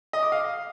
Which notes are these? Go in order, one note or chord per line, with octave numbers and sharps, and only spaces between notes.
D#5
D6
F5